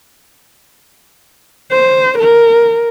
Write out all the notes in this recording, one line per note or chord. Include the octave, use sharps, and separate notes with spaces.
C5
A#4